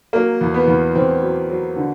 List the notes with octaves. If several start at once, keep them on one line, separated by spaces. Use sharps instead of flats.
F#3 A#3
E2
B3
E2
E2 C4
F#3
F#3
D3